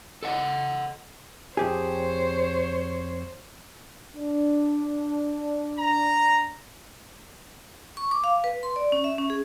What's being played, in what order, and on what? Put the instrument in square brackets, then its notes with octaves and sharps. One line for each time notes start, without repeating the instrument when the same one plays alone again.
[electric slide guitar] A4 D#5 F#5
[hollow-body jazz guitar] F2 G4 G#4 [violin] C5 C#5
[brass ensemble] D4
[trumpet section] A#5
[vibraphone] C#6
D6
F5
B4
C6
D5
C#4
E5
C#4
G#4